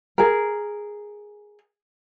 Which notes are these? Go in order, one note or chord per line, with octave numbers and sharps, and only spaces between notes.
G#4 A#4